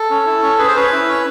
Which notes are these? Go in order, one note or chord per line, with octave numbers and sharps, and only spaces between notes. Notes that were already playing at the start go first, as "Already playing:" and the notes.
Already playing: A4
C#4
E4
C#4
G#4 B4
C5
C#4 B4
E4
C#4